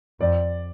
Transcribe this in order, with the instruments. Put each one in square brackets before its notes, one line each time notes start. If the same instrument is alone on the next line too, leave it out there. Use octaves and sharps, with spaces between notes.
[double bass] F2 [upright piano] D5